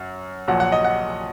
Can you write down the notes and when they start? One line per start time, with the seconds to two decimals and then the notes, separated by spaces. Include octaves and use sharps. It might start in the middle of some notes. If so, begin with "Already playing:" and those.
Already playing: F#2
0.48 A#1 A#2 F#3 F#5
0.60 F#5
0.72 D#5
0.84 F#5